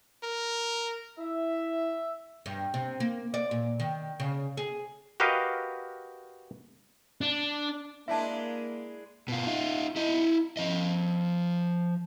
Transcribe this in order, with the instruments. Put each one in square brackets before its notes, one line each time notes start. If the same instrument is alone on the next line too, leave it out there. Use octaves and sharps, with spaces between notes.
[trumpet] A#4
[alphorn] E4 [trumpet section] E5
[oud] G2
C3
A#3
D5
A#2
D#3
C#3
G#4
[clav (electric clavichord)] F#4 G4 A#4 B4 D#5 F5
[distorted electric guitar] D4
[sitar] G#3 D4 E4 [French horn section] A#3 [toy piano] E5 A5
[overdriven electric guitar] B2 F4
D#4 F4
E4 D#5
F3 D#5